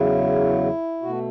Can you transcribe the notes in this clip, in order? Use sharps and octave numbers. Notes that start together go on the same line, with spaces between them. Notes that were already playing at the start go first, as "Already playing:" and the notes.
Already playing: E2 C#3 F#3 E4
B2 A3 F#4